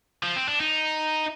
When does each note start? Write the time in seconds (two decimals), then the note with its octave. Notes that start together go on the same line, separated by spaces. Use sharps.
0.23 F3
0.36 C4
0.48 D4
0.60 D#4